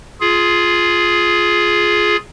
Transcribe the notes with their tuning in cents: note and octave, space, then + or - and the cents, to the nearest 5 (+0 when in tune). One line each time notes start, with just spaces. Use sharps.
F4 +0 G#4 +10